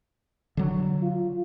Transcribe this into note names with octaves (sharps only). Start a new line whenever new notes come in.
D3 F#3
F4